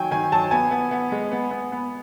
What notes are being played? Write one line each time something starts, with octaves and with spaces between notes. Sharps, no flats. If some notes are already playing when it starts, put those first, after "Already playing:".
Already playing: D#3 F#3 G5 G#5
D#3 G#5
F#3 A5
B3 G#5
B3
B3
G#3
B3
B3
B3